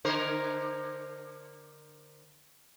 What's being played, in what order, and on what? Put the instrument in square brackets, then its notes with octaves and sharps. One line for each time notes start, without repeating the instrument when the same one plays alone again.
[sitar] D3 A#4 C5